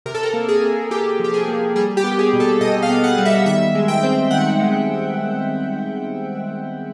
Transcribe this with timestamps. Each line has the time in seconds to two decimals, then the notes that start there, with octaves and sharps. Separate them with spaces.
0.06 C3 A#4
0.15 A4
0.23 A#4
0.34 A#3
0.49 G#4
0.63 C3
0.90 A#3 G4
1.19 F3 G4
1.34 G#4
1.48 A#3
1.76 G3 G#4
1.97 G4
2.04 B3
2.19 G#4
2.33 B2
2.40 A4
2.61 B2 D#5
2.82 F5
2.90 B3
3.04 F#5
3.18 G3
3.25 E5
3.46 D#3 E5
3.75 G#3
3.88 G5
4.03 C4
4.31 D#3 F#5
4.60 G#3